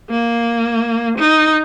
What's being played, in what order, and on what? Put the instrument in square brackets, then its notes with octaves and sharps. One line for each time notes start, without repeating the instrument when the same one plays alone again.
[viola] A#3
D#4